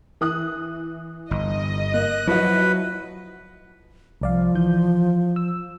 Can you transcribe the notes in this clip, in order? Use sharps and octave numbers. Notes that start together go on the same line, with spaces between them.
E3 D#6 F#6
G1 D#5
A#3 F#6
F3 F#3 E4 F#4 B4
C2 F3 D5 F5
E3 G6
E6